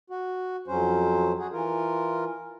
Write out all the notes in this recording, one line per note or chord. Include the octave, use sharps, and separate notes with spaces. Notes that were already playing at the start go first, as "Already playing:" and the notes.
F#4
F2 F#3 C#4 C5
F#4 G#4
E3 F4 A#4